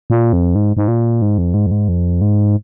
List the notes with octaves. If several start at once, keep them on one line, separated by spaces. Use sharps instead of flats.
A#2
F2
G#2
G#2
A#2
G#2
F2
G#2
F2
G#2
F2
G#2